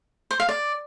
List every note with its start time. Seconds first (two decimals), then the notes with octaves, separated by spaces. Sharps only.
0.31 C5
0.40 F5
0.49 D5